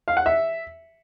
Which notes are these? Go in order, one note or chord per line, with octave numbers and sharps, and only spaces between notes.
F5
F#5
E5